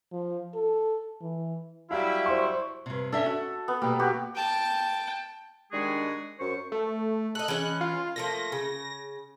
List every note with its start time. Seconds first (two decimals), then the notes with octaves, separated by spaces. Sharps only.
0.12 F3
0.55 A4
1.21 E3
1.91 F#3 G3 E4 F5
2.26 C5 C6 C#6
2.86 G2 C3
3.12 C#4 D4 A4 E5
3.26 F#4
3.68 B3
3.82 B2 G3 A#3
3.99 F#4 G4
4.35 G5 A5
5.72 D#3 G3 G#3 D4 F#4 G#4
6.40 F#2 C#4 C5 C#6
6.72 A3
7.35 A4 D#5 F#6
7.48 E3 G#3 C#4
7.81 F4
8.16 F3 A3 A#3 A#6
8.52 C#3